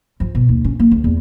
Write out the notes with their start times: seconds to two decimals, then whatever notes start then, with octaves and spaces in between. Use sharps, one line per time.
0.20 F3
0.35 B2
0.49 D#2
0.65 C#4
0.80 A#3
0.91 D2
1.04 E2